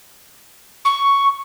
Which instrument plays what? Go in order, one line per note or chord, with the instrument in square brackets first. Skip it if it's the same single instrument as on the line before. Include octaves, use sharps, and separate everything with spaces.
[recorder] C#6